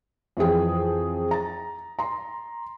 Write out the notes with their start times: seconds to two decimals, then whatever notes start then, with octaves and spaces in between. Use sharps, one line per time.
0.37 F2 E3 F4 G#4 G5
1.31 A#5 A6
1.99 A#5 C6